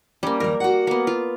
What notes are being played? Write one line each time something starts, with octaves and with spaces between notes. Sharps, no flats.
G3 A#3 C#4
D#2 G3 A#4
F#4 F#5
A#3 B3
F4